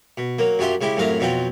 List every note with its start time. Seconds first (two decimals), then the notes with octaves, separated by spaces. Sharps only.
0.17 B2
0.39 F#3 A#3
0.59 F#2 F#3 F4 G4 E5 C6
0.81 C#3 G#3 E4 G4
0.97 F#2 A2 C3 F#3 F5 A#5
1.20 F2 B2 F#3 C4 F4 G5